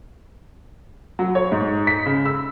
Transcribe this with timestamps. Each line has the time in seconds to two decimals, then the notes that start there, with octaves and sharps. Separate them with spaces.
1.19 F#3
1.35 C#5
1.52 G#2
1.87 B6
2.06 C#3
2.25 E6